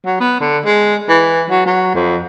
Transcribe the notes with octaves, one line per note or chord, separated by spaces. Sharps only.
F#3
B3
D3
G#3
E3
F#3
F#3
F2